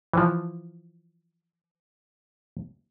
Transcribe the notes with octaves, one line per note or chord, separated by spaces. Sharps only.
E3 F3